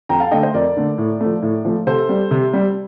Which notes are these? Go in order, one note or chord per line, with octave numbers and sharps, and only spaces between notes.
F2 G5 A#5
F5 A5
D3 A3 D#5 G5
C5 D#5
F2 A#4 D5
D3 A3
A2
F3 A3
A2
F3 A3
C3 A4 C5
G3
C3
G3